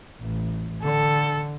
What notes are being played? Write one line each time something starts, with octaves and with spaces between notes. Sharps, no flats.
A1
D3 A4